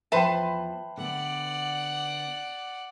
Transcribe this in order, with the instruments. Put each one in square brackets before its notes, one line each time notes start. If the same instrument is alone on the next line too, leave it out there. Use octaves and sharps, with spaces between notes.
[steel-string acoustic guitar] E2 F3 [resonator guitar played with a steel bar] B4 C5 A5 [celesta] E5 G5
[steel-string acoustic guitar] D3 B3 [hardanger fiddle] D5 F#5